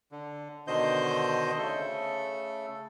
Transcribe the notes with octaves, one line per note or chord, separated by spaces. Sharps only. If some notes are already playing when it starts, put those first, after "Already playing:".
D3
B2 D3 D#3 C5 D#5 G6
C#3 A3 A4